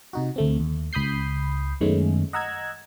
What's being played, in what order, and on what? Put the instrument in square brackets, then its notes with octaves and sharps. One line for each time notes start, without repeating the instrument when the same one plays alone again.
[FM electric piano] C3 D#4 F#4
D2 A3 C4
D#2
C#2 B5 D#6 G6 C7
F#2 D#3 G#3 A3 B3 C#4
D#5 F#5 A#5 E6 F#6 G#6